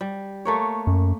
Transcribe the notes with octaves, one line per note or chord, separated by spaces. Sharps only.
G3
A3 A#3 C#5
F#2